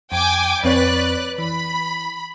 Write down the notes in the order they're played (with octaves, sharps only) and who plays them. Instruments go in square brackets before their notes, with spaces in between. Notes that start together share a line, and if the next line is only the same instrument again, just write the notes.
[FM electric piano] F2 [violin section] G5 G#5 D6
[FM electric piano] F2 C4 C#5 [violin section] B4 D5 F#6
[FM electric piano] E3 [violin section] B5